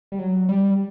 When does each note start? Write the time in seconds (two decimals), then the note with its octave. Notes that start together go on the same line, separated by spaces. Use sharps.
0.12 G3
0.19 F#3
0.49 G3